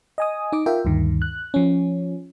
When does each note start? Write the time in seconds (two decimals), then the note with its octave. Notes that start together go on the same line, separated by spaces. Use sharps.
0.18 D#5 G#5 D#6
0.52 D#4 D#5 D6
0.66 F4 A#4 E5 G5
0.85 D2 G2 D#3
1.22 F#6
1.54 F3 C#4